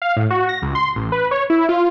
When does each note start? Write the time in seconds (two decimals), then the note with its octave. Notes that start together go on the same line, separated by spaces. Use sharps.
0.02 F5
0.16 A2
0.30 F#4
0.49 A#6
0.62 C#2
0.75 C6
0.96 A1
1.12 B4
1.31 C#5
1.50 E4
1.69 F4